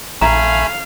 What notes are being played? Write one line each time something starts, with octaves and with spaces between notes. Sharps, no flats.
A#1 A3 F5 G#5 A#5 B5